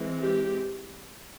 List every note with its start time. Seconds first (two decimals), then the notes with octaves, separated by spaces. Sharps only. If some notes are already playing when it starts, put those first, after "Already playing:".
Already playing: E3 G#3 C4
0.23 G4